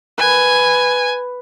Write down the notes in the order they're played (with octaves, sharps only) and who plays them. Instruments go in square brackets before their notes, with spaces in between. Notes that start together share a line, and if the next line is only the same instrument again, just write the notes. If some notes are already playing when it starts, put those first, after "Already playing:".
[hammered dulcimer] B4 [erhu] G#5